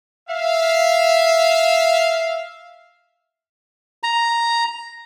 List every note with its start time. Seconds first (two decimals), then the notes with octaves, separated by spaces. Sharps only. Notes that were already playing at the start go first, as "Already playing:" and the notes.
0.29 E5 F5
4.03 A#5